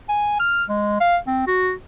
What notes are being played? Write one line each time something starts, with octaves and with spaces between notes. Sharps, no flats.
G#5
F6
G#3
F5
C4
F#4